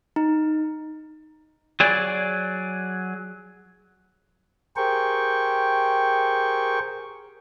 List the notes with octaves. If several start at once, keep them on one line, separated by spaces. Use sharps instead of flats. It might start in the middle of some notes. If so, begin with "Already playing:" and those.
D#4
F#3 G#4 D5
G4 G#4 A#4 C5 G5 C#6